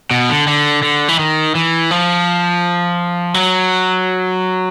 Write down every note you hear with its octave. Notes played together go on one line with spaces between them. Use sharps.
B2
D3
D3
D3
E3
D#3
E3
F3
F#3